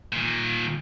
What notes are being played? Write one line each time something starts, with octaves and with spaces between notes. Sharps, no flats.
A#2 D#3